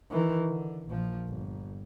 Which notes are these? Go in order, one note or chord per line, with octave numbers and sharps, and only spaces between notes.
D#3 E3
D3
A#1 F3
G1